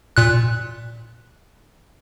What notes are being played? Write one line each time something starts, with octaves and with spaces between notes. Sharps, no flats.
A#2 F#6